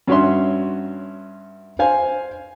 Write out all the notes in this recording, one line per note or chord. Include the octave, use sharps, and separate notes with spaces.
G2 C#4 F#4 C#5 E5 C6
C5 F5 G#5